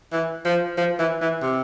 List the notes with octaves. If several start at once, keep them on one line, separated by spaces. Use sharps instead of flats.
E3
F3
F3
E3
E3
C3